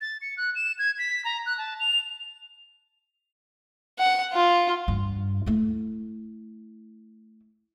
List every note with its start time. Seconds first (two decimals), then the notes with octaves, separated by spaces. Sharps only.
0.01 A6
0.22 C#7
0.37 F#6
0.55 E7
0.79 G#6
0.98 B6
1.25 A#5
1.46 F#6
1.58 A5
1.80 F7
3.99 F#5
4.33 F4
4.88 G2
5.46 A3 E4